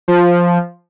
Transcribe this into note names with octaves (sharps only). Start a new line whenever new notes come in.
F3